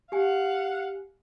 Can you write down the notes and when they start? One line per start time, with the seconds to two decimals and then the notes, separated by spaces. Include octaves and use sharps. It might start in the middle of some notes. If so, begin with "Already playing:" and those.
0.12 G4 F5 F#5 G#5